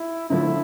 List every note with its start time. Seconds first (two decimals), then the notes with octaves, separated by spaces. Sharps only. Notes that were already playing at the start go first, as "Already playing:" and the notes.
Already playing: E4
0.29 D3 F3 A3 E4